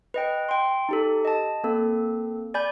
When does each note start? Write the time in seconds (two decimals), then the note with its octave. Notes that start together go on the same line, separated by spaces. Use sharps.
0.14 B4 D#5 G5
0.49 G5 C6
0.89 D#4 G4 A4
1.25 D#5 A5
1.64 A#3 C4 A4
2.54 D5 G#5 B5 G6